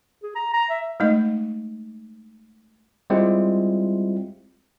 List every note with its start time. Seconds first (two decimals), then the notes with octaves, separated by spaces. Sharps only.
0.23 G#4
0.35 A#5
0.54 A#5
0.70 E5
1.00 G#3 A3 D#4 D#5
3.10 G3 G#3 C4 E4 F4